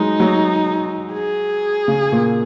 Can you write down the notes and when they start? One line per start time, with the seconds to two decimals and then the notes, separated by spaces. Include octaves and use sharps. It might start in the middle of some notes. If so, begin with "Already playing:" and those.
Already playing: F#3 G#3 D#4
0.20 F#3
1.13 G#4
1.88 C#3
2.12 A#2